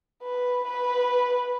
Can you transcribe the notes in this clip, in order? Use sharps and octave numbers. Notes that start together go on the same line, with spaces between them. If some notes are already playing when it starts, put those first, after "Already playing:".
B4
B4